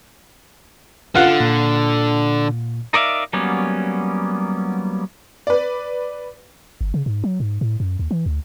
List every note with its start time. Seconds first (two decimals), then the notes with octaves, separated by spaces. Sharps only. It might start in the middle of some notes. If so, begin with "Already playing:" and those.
1.15 D3 F4 F#5
1.40 A#2
2.93 D#4 A#4 D5 E5 F5
3.33 F#3 G3 A#3 B3 C#4
5.47 B4 D5
6.81 G1
6.94 C#3
7.06 G#2
7.24 F#3
7.40 G#2
7.61 A2
7.80 F#2
7.99 D#2
8.11 E3
8.26 D2